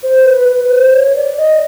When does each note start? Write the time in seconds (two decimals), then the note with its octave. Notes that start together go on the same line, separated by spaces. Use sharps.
0.03 C5
0.26 B4
0.48 B4
0.70 C5
0.92 C#5
1.15 D5
1.37 D#5